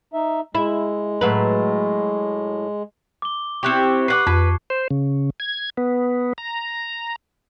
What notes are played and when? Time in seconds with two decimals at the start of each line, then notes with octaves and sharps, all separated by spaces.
0.13 D#4 E5
0.55 G#3 E4
1.21 A2 F#3 B4
3.22 D6 G7
3.63 C4 E4 G4 C#6 F#6 C#7
4.08 B4 F#5 D6 C7
4.27 F2 B4 A5 D6 G#6
4.70 C5
4.91 C#3
5.40 G#6
5.77 B3
6.38 A#5